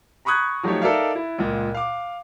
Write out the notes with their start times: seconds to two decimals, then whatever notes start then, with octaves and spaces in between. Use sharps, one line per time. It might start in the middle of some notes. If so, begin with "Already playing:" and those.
0.25 A#5 B5 C#6 D#6 F#6 G#6
0.63 F3 F#3 A3 D#4 G4 C#5
0.82 D#4 A4 A#4 D5 E5 F5
1.15 E4
1.38 C#2 A#2
1.74 F5 D6